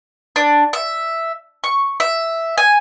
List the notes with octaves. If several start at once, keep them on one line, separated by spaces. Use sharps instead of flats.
D4
E5
C#6
E5
G#5